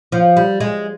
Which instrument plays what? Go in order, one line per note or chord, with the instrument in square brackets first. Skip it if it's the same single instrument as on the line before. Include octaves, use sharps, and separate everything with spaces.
[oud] F3
G3
G#3